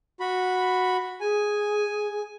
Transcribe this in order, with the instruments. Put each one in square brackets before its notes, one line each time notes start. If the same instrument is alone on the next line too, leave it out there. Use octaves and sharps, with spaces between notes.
[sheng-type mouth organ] F#4 B5
[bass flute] G#4 [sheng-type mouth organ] G#5